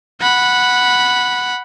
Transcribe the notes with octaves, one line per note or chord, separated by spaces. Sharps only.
F#5 B5